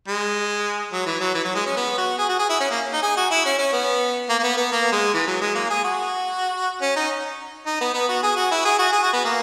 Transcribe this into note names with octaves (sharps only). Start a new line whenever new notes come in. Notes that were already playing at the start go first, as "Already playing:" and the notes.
G#3
F#3
E3
F#3
E3
F#3
G#3
C#4
B3
F#4
G#4
F#4
G#4
E4
C#4
A#3
D#4
G#4
F#4
E4
C#4
C#4
B3
A#3
A#3
B3
B3
A#3
G#3
E3
F#3
G#3
A#3
G#4
F#4
C#4
D#4
D#4
B3
B3
F#4
G#4
F#4
E4
G#4
F#4
G#4
F#4
B3
A#3